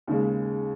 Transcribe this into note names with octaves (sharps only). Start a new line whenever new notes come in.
D#2 C#3 G#3